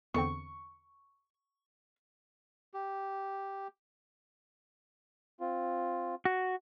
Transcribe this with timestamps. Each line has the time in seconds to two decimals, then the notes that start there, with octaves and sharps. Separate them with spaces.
0.14 E2 D3 C4 C#6
2.74 G4
5.41 C4 F4
6.25 F#4